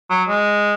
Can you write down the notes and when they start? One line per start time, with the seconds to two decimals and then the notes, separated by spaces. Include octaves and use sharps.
0.10 F#3
0.29 G#3